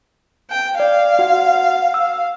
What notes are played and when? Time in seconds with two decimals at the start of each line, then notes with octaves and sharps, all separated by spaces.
0.49 G5
0.80 D5 F5
1.19 F#4 F#5
1.94 E6